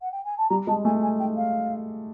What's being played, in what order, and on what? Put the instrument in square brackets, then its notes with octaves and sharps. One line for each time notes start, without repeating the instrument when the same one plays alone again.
[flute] F#5
G5
G#5
A5
[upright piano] G3 [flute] A#5
[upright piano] G#3 [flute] A5
[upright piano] A3 [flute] G#5
[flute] G#5
G5
F5